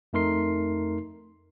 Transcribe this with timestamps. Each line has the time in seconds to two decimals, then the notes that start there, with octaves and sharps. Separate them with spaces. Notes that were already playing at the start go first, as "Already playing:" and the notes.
0.13 F2 A3 D#4 A#4 C6 C7